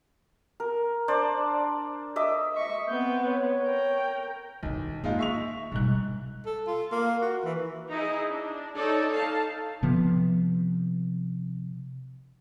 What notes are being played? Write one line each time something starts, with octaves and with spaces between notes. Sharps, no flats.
A#4
D4 C5 D5
D#5 E5 D6
D#5 E5 C#6
B3 C4 G6
C#5
A#4 G5
B1 D#3 D#4
G#3 A#3 D#4 F4
E5 C#6 F7
G#2 B2 G3 F#6
A4
F4
A#3
F#4
E3
D#4 E4 G#4 D#5
D4
D#4 A4 C#5 D5
D#4 F5 A5
C3 F3 B3